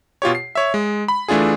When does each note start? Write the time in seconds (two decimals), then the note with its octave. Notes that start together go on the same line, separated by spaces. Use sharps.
0.22 B2 F4 G4 C#5
0.35 C7
0.55 C#5 E5
0.74 G#3
1.08 B5
1.28 E3 A3 D4 F4 G#4